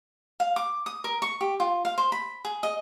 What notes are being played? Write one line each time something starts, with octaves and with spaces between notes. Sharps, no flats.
F5
D6
D#6
A#4
C#6
G4
F4
F5
C5
B5
G#4
D#5